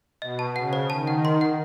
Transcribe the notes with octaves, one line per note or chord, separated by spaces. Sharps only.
B2 D#5
A5
C#3 F#5
C5
D#3 A5
F#5
C6
F#5